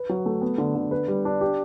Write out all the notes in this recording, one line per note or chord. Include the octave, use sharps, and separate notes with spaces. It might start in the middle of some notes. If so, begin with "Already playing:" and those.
Already playing: B4
F#3
A3
B3
D3
D3
B4
G3
D4
G4